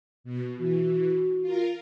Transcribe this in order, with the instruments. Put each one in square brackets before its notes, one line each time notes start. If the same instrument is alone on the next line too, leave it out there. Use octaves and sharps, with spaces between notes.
[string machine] B2
[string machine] E3 [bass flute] F#4
[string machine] F4 A#4